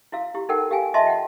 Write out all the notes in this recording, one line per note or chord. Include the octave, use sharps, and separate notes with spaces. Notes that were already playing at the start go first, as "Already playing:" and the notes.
E4 F#4 F5
E4 G4
D#4 A4 A#4 F#5 G5
G4 F5 G5 G#5
F4 D#5 E5 A5 C6
F#5 G5